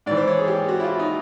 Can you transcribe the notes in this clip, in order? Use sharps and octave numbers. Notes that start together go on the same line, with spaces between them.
G#2 E3 D5
C5
C#5
G#4
G4
F#4
E4
F4
D#4